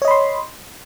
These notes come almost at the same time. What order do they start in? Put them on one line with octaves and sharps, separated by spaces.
C#5 D#5 B5 C6